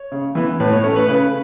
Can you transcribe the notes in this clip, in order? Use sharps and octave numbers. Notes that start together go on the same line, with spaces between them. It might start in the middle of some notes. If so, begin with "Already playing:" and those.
Already playing: C#5
C#3
E3 B3
A2 B4
C#5
A3 C#4 C#5
B4
C#3 B4